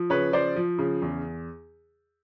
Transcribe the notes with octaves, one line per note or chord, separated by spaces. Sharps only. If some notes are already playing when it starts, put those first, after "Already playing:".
Already playing: F3
C#3 B4 C#5
F3 C5 D5
F3
C#3
E2